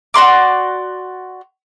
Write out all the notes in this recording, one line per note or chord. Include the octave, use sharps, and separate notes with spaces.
F#4 D5 C6 D6